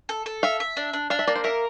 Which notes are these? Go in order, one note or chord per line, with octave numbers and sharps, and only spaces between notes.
A4
A4
E5 F5
E5
D4
D4
D4 F5
E5
A#3 D5
C5
A#4 E5